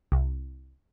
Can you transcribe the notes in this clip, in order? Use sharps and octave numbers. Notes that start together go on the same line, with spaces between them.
C2